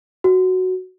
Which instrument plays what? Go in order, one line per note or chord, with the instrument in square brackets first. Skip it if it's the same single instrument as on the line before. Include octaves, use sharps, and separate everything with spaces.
[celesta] F#4